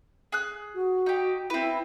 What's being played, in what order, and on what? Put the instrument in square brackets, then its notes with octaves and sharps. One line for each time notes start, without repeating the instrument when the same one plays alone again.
[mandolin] G#4 F#6
[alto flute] F#4
[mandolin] D#4 G4
[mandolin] C4 B4 [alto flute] E4